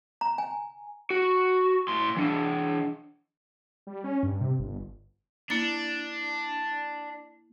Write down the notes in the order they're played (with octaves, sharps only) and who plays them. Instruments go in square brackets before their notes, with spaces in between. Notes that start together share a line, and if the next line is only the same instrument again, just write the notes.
[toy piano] A#5
G#5
[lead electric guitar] F#4
A2 C6
E3 D4
[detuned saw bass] G3
C#4
G2
C3
G1
[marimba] A#3 E4 A6 [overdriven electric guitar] D4